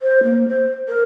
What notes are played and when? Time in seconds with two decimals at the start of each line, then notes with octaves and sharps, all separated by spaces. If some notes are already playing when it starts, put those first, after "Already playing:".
0.01 C5
0.23 A#3
0.48 C5
0.88 A#4